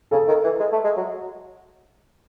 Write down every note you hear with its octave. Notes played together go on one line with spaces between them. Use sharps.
C#3 A4
D#3
E3
G#3
A3
G#3
F#3